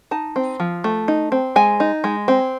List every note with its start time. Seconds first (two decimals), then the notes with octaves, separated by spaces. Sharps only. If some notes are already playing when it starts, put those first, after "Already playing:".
0.11 D#4 A5
0.36 C4
0.60 F3
0.84 A3
1.08 D#4
1.32 C4
1.56 G#3 G#5
1.80 D#4
2.04 G#3
2.28 C4